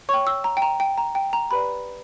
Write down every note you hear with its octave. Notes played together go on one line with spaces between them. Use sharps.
C#5 G5 C#6
E6
A#5
G5
A#5
G5
A#5
G5
A#5
G4 B4 D5 B5